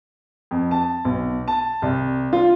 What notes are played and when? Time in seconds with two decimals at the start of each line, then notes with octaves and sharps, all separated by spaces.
0.51 F2
0.71 A5
1.05 B1
1.48 A5
1.82 C2
2.33 F4